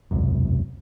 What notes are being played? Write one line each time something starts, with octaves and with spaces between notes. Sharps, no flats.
E1 C2 F#2